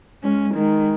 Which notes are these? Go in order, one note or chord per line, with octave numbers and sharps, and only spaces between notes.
G#3 C#4
D#3 G#3